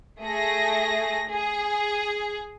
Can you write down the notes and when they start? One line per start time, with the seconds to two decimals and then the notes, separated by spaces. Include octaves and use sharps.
0.21 A3 G#4 A#6
1.29 G#4